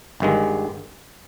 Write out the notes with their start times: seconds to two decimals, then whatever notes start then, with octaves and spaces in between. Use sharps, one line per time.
0.20 G1 G2 D#3 G#3